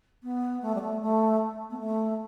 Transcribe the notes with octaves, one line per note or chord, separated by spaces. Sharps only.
B3
A3
G3
A3
A3
B3
A3